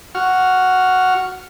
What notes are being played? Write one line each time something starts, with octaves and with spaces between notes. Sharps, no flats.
F#4 F6